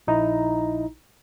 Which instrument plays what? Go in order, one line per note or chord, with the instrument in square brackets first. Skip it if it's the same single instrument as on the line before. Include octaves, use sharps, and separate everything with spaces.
[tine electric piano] A#1 D#4 E4 A#5